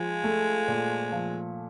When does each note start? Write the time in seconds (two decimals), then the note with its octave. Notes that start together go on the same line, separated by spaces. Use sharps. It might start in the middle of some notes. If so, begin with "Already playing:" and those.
Already playing: F3 G#3
0.24 A3
0.68 A#2
1.12 F3